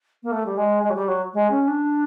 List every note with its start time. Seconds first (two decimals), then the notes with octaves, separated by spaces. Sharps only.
0.23 A#3
0.31 A3
0.46 G3
0.57 G#3
0.83 G#3
0.90 F#3
0.95 G3
1.08 F#3
1.34 G#3
1.50 C#4
1.67 D4